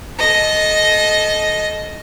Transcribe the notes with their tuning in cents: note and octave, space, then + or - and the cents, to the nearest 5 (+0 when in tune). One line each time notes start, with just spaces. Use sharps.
A4 -30 D#5 +0